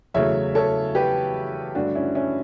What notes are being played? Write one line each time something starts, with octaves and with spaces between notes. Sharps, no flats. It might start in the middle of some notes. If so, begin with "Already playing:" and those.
E2 C#3 F#3 A3 C#5 E5
A4 C#5
G4 B4
G2 D3 A3 D4 F#4
C#4 E4
C#4 E4